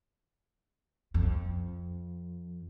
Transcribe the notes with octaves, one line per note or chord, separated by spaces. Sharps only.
F2